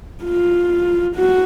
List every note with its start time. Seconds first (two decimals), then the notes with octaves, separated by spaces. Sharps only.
0.24 F4
1.16 F#4